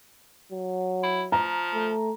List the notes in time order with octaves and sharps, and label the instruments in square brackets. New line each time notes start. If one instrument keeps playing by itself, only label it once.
[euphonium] F#3
[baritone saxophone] E4
[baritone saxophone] F3 [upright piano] A#5
[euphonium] A3